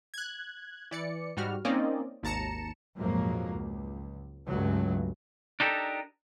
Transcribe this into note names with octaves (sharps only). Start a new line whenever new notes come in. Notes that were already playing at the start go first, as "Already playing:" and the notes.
F#6 G#6
E3 D5 C#7
G#2 G3 F#4 F6
A#3 C4 C#4 D#4 D5 D#5
G#1 D#2 A5 A#5 C#7 E7
A#1 F2 G#2 F3 F#3 A#3
C#2
C#2 G2 C#3 F#3 A3
D4 D#4 G4 A4 A#4